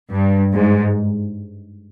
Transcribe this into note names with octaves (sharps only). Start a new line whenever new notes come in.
G2
G#2